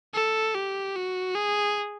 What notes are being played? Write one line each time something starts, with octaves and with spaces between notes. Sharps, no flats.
A4
G4
F#4
G#4